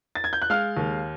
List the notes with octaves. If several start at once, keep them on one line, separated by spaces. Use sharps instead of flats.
A6
G#6
G6
F#6
G#3 F5 F6
D#2